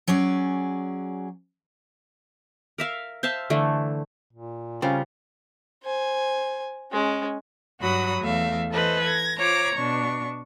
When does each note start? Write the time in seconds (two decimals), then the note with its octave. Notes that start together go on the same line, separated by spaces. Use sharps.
0.08 F#3 C#4 G#4 D5
2.78 A#4 E5 F5
3.23 C5 E5 F5 A5
3.50 D3 E3 A3
4.33 A#2
4.82 C#3 G3 C4 C#4 F4 A#4
5.83 C5 G#5
6.91 G#3 C#4
7.80 G2 F#3 F#4 B5 D#6
8.22 E2 A3 E5 F5
8.70 E3 A4 B4 C5 D#5
9.04 G#6 A#6
9.37 F4 C5 C#5 A#5 D6
9.74 B2 D4 C#6